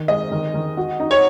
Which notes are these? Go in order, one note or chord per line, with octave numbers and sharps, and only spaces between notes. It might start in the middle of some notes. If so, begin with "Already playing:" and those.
Already playing: D#3
G#3 D#5
D#3
D#3
F#4
D#4
C#5